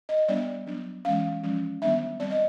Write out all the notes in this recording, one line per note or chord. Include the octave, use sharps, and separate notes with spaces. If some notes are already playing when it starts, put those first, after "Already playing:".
D#5
G3 B3 D4 D5
F#3 B3 D4
E3 G#3 C#4 F5
F3 G#3 C#4
D#3 G3 B3 D4 E5
G3 C4 D5
D#5